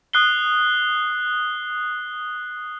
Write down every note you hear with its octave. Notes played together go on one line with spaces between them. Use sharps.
D#6 F#6 C7 G7